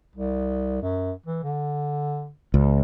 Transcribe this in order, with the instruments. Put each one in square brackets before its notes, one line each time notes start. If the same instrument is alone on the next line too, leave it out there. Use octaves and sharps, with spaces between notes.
[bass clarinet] C2
F#2
E3
D3
[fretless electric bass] C#2